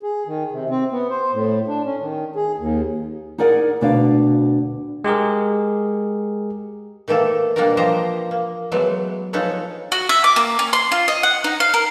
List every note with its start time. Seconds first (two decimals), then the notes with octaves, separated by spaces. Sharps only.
0.03 G#4
0.27 D#3
0.52 C3
0.70 C4
0.91 B3
1.10 C5
1.32 A2
1.68 D4
1.85 C#4
2.01 D#3
2.35 G#4
2.58 D#2
3.38 D#4 G#4 A#4 D5 F#5
3.81 D2 B2 D4 D5 F5
5.04 G#3 G4 G#4 A#4
7.08 D#3 E3 A3 A#3 A4
7.56 B2 G3 A#3 D4 F#4 A#4
7.77 E3 F3 G4 C5 D#5 A#5
8.31 A#3
8.72 E3 F#3 G#3 A3 B3
9.33 F3 C#4 D#4 A4 B4 C#5
9.92 F#4
10.09 E5
10.24 D6
10.36 A#3
10.59 C#4
10.73 C6
10.92 F4
11.08 D#5
11.23 F#5
11.44 D#4
11.60 F5
11.74 A#4